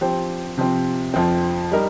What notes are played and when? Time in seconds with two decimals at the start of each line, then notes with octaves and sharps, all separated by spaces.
0.01 F3 C4 G4 C5
0.58 C3 F3 C4
1.14 F2 F3 C4
1.72 G3 D#4 A#4